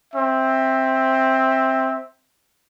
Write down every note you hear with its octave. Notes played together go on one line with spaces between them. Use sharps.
C4 E5